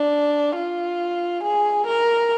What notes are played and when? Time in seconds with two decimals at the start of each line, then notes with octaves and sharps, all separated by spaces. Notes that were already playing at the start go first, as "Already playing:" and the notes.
Already playing: D4
0.56 F4
1.44 G#4
1.87 A#4